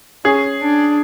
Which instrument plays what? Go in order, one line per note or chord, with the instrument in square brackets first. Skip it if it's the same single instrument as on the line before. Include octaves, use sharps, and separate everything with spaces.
[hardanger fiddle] C#4 [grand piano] G#4
[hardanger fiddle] D4